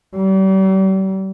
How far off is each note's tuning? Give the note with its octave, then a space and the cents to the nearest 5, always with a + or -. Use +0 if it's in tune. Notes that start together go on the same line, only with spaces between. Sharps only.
G3 -40